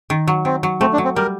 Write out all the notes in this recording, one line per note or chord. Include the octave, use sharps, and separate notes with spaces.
D#3
F#3
D#3 C4
F#3
A3 C4
D4
F#3
C4
G3 A#4